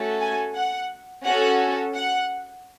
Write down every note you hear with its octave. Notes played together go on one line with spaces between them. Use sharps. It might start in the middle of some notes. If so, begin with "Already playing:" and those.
Already playing: A3 C#4 F#4 A4
G#5
F#5
C#4 F#4 A4 F#5
F#5